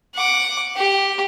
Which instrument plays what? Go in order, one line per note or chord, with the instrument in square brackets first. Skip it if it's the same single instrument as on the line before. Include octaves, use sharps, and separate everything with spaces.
[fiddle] F#5 D6
G4